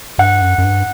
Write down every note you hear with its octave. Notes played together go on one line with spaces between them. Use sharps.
G2 F#5
F#2
F#2
G2